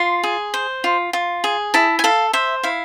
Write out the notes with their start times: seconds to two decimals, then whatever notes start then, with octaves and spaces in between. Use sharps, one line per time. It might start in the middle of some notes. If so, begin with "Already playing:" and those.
Already playing: F4 C6
0.24 G#4
0.54 C5
0.84 F4
1.13 F4
1.44 G#4
1.74 E4 A5
1.99 G#5
2.04 A4 F5
2.33 C5 E5
2.63 E4 F5